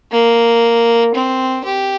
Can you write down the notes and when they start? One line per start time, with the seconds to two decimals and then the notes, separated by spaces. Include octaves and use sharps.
0.12 A#3
1.14 C4
1.64 G4